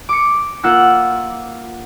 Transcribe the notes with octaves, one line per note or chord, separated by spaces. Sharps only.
D6 C#7
A#3 F4 F#5 E6